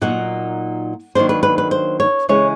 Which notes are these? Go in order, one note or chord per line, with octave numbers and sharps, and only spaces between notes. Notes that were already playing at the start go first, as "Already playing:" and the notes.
A#2 F#3 A#3 D#4 F#5
D#3 F#3 A#3 D4 C5
B4
B4
B4
C5
C#5
C#3 E3 G#3 C#4 C#5